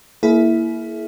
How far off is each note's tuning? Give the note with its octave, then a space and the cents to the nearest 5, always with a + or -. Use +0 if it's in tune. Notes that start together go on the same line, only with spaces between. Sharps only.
A#3 +0 E4 +0 G#4 +40